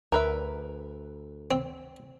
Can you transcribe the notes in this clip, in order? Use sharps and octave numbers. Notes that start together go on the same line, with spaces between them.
D2 A#4 B4 E5
C4